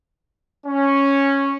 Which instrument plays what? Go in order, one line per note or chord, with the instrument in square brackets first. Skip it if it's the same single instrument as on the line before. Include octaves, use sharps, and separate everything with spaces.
[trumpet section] C#4